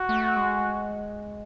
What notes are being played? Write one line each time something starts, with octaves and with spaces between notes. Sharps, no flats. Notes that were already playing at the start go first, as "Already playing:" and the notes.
Already playing: F#4
A3
G#3